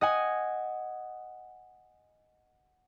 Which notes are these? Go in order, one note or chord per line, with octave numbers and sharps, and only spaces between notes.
D#5 F#5 G#5